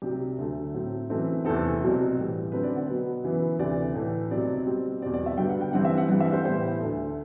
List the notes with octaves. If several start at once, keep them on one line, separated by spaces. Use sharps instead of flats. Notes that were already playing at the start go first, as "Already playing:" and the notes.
C2 C3 F#3 G4
D2 D3 F#3 A3
A2 F#3 C4
F#2 E3 A3 C4
E2 C3 E3 A3 C4 A4
C2 B2 F#3 C4
A2 E3 G3
F#2 D3 A3 C4 B4
D5
F#5
B2 F#3 B3
F#2 E3 B3
D2 C3 E3 D5
A2 E3 A3
C2 B2 F#3 C4 D5
B2 G3 C4
E2 B2 G3 C4 D5
D5
E5
G2 D3 F#3 B3 G5
F#5
G5
G2 E3 G3 C4 F#5
E5
F#5
G2 E3 G3 C4 F#5
E5
C5
A2 E3 G3 B3 C5
D2 D3 A3